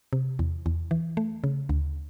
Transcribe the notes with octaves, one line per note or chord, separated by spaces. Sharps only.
C3
E2
E2
E3
A3
C#3
D2